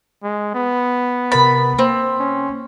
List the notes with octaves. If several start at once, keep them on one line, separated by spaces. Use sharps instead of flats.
G#3
B3
C3 A#4 B5 A6
A#3 C4
C#4